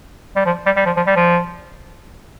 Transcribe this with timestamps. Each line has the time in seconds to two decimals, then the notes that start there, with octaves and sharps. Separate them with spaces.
0.36 G3
0.46 F3
0.66 G3
0.76 G3
0.86 F3
0.97 F3
1.07 G3
1.16 F3